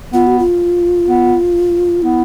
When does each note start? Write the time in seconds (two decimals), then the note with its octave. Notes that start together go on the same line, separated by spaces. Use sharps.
0.13 B3 F4
0.27 F#4
0.39 F4
1.07 B3
2.02 B3 E4